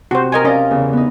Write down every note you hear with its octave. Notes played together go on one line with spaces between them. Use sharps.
C3 F#4 C5
A#4 D#5 G#5
C#4 A#4 D5 D#5 F5
E2 C#3
B3 D#4